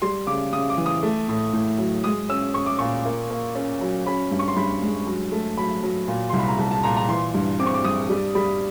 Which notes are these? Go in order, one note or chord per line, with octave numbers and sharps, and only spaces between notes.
G3 C6
C#3 D6
C#3 D#6
D6
E3
D#6
A3
A2
A2
F#3
G#3 D#6
C#4 E6
C#4 C#6
D6
A#2 C#6
A#3
A#3
C#4
F#3
C#4 B5
G2
C#6
C6
G2 B5
G#3
F#3
A3
F#3 B5
F#3
A#2
C2 C6
B5
A#5
C2 A5
A5
A#2 A#5
A#5
E3 C6
G2
C4 D6
C#6
D6
G2 D#6
G3
G3 B5